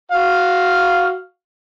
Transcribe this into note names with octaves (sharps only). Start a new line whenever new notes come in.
F#4 F5